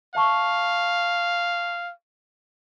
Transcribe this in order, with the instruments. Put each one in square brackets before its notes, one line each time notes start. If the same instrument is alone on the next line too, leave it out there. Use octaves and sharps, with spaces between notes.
[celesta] E5 A5 C#6 [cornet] F5